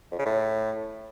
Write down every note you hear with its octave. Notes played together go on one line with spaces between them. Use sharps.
F2
C#3
A2